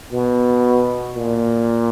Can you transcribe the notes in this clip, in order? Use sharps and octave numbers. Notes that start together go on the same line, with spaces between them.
B2
A#2